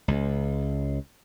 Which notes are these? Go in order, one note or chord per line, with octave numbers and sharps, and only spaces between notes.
C#2